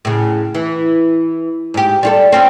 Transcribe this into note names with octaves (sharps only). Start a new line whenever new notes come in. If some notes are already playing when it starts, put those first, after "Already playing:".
A2 C#3
E3
G#2 G4
G3 F4 A4
C4 C#4 F4